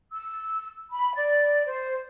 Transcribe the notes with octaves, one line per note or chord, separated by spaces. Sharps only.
E6
B5
D5
C5